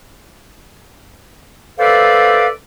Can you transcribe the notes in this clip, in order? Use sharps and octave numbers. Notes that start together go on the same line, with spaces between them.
A4 B4 C5 D5 E5 F5